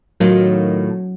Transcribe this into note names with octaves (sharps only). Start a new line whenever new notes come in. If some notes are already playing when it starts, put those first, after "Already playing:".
A2 D#3 F#3 F4